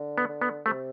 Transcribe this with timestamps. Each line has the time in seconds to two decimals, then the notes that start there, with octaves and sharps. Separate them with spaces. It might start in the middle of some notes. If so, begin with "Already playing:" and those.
Already playing: D3
0.18 B3
0.29 D3
0.41 B3
0.66 C3 A3